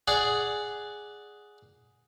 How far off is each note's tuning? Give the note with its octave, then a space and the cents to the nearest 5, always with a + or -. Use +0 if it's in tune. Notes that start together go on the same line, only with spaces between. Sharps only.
G#4 +5 D5 +0 F#5 +5